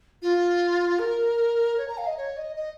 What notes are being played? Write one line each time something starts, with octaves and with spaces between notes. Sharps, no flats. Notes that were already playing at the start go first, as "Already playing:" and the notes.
F4
A#4
C#5
A#5
F5
D#5
C#5
D#5
D#5